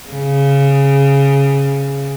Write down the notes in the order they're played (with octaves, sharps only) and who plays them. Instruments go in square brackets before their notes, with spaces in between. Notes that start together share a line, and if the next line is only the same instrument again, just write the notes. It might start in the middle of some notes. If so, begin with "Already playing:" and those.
[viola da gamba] C#3